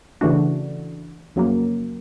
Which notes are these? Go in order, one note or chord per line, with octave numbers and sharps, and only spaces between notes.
C#3 E3 A3 D4 F#4
F2 C#3 F#3 A#3